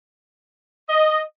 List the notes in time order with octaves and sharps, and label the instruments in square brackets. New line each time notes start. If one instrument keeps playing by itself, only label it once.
[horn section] D#5